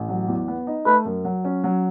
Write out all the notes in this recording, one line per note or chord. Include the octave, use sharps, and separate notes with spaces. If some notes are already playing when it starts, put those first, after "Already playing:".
Already playing: A1
F#3
E2
B3
D#4
A3 B4
F#2
F#3
C#4
F#3